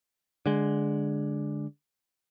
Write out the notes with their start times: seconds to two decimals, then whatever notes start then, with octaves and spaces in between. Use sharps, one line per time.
0.46 D3 G#3